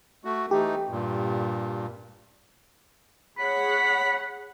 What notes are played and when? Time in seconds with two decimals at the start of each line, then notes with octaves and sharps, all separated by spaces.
0.25 A3 F#4
0.51 E3 A3 D#4 G4
0.90 G2 A#2
3.38 G#4 C#5 F#5 B5